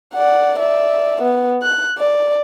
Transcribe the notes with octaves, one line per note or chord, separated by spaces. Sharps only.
D5 F#5
D5 E5
B3
F#6
D5